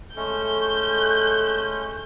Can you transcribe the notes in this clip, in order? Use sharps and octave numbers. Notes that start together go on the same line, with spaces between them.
G#3 A3 C#4 A4 G6